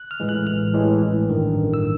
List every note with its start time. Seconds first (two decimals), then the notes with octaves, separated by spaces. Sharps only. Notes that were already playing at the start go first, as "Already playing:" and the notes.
Already playing: F#6
0.11 F6
0.20 A2 E3 G#3
0.29 F#6
0.47 A1 F6
0.74 A2 E3 G#3
1.01 A1
1.28 G2 D#3
1.55 A1
1.74 E6